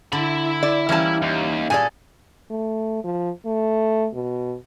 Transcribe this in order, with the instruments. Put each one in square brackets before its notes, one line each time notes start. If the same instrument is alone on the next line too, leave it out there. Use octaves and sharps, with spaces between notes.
[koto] D3 [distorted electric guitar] E4 B5
[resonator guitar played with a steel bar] D5
[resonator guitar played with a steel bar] E3 A5 [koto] G3 A#3 C#4
[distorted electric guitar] D#2
[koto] A#2 G#4 A4 [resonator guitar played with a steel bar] D5 G#5
[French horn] A3
F3
A3
B2